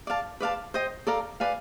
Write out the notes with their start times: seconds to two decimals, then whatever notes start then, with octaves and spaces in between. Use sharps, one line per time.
0.07 D5 F5 A5
0.40 B4 D5 F5 A5
0.74 C5 D#5 G5
1.07 A4 D5 F5 A#5
1.40 B4 D5 F5 G#5